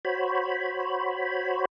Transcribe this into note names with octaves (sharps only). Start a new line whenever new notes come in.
F#4 C5 C#5 B5